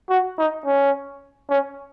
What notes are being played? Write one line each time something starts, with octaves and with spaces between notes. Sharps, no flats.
F#4
D#4
C#4
C#4